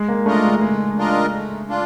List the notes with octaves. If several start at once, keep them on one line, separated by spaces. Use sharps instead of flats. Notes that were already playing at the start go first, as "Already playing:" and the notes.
Already playing: G#3
A#3
A3 D4 F4 A#4 D#5
G#3
G#3 A3
D4 F4 A#4 D#5
A3
D4 F4